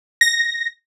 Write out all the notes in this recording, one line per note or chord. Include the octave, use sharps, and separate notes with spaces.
A#6